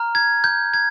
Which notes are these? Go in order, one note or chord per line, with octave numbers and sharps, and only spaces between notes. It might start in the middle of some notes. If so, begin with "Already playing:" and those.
Already playing: A#5 F6
G#6
G6
G#6